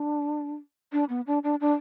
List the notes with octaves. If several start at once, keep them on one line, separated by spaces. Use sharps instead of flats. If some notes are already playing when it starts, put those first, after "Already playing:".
Already playing: D4
D4
B3
D4
D4
D4